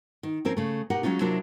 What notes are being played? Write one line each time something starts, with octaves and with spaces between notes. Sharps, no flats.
D#3
F3 C4 C#4 A#4
C#3 A3
B2 D#4 G4 A#4 F#5
F#3 G#3 C#4 D#4 F4
C3 F#3 D4 E4 F4 A#4